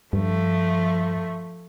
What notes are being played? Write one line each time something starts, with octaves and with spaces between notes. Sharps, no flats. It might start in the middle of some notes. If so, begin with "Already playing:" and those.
G2 F3 A3